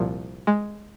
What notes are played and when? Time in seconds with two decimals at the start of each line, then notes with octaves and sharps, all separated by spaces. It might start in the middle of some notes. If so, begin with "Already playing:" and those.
Already playing: C2 A#2 F3
0.47 G#3